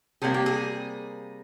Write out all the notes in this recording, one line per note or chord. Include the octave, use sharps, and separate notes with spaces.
C3 G3 A#3 G#4
G4
G#4